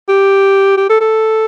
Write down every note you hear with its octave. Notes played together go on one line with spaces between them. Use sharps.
G4
G4
A4
A4